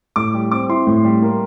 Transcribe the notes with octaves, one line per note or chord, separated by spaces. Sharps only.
A2 D6
G3
C4 D6
E4 C6
A2
G3
A#3